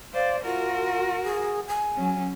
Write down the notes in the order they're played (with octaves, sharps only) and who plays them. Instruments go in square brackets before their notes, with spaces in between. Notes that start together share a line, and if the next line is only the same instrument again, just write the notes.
[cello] C5 D5 [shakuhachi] F5
[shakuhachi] F4 [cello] F#4 A#4
[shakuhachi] G#4
G#5
[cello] F#3 C#4